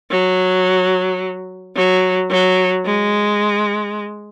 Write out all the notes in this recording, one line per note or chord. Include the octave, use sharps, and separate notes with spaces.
F#3
F#3
F#3
G#3